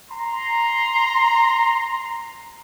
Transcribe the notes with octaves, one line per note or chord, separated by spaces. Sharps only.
A#5 C6